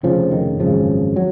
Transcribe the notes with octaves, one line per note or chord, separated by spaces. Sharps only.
F1 F2 C#3 F3
D#3
G#1 F#2 C#3 F3
F#3